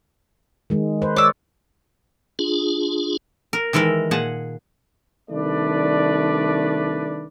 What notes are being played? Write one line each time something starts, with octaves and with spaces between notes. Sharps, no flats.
D#3 G#3
B4 C5
C#5 D5 D6 E6
D4 F4 G#4
A#4
D#3 E3 G#3 A4 A#4
A#2 G#4 F#5 A5
C2 D#3 A3 D4 B4 D5